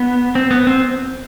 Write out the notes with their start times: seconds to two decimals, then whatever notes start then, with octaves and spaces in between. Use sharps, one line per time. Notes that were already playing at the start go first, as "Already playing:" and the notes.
Already playing: B3
0.35 C4
0.51 B3
0.67 C4